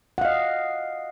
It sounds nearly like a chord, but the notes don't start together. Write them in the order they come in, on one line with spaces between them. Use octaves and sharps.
F#5 F5 D#5